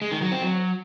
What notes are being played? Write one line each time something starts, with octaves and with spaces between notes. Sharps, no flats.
G#3
D#3
F#3
C4
F#3